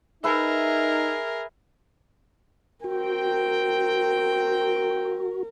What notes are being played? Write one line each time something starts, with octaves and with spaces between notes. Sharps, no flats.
D#4 G#4 A#4 B4 E5
C4 F#4 A#4 G5